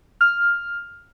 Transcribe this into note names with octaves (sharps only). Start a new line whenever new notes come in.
F6